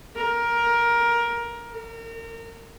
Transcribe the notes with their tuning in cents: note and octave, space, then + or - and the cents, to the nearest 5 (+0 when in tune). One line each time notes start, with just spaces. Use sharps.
A#4 +15
A#4 -30